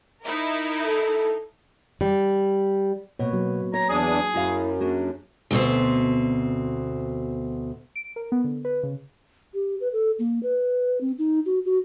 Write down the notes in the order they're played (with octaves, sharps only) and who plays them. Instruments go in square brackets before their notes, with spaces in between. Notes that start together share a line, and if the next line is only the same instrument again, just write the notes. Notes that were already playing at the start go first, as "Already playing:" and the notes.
[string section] D#4 E4 A#4
[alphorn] A4
[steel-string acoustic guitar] G3
[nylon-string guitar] B2 [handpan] A#3 C#5
[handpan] F#3
[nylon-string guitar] C#5 [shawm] A#5
[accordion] E2 D4 D#6 [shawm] G#4
[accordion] F#2 [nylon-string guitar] E4 F#4 F5
[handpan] A#3 [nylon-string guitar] D4 F#4 G#4
[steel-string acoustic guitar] D2 B2 C4
[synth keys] D7
A#4
B3
D3
B4
C#3
[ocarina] G4
B4
A4
A#3
B4
C4
D#4
F#4
F#4